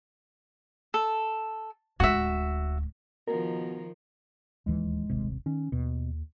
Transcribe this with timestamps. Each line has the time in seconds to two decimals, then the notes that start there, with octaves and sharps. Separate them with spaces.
0.94 A4
2.00 D1 G#3 F#4 E5
3.28 B2 D#3 F3 A#4
4.66 D1 D#2 E3 G#3
5.10 D#1 G#1 C3
5.46 D#3 C#4
5.72 D#2 B2